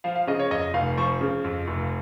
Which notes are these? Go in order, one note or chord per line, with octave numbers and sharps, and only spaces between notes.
F3 F5
F5
C#3 D#5
C#5
F2 D#5
F1 F5
F3 C#6
C#3
F2
F1